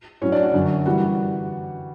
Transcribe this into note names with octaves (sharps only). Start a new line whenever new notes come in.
A2 F#3 C#4 C#5
D4 D5
F#4 F#5
F#2 D3 F#3
E3 G3 F#4 F#5